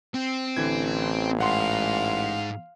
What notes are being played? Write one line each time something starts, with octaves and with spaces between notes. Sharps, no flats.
C4
A1 D3 E3 G#6
G#2 F5 F#5 C6